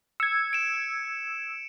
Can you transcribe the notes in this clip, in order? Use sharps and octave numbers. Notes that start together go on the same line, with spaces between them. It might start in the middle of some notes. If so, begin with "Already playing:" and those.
E6 G#6 C#7
D7 E7